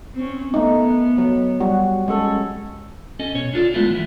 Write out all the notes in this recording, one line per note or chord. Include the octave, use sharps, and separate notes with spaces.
C4 C#4
A3 B3 D#4
F#3
G3 F#4
G#3 C#4 A4
C#4 A4 D#5
B2 C#5
D4 F4 A4 D5
G#3 A3 B3 E4 F4
E3 E4